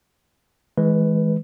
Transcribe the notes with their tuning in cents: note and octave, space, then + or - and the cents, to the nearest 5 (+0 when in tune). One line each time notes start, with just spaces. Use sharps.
E3 -30 G#3 +15 B4 +5